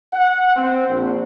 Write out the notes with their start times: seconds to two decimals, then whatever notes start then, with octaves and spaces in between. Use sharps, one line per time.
0.13 F#5
0.57 C4
0.88 A#1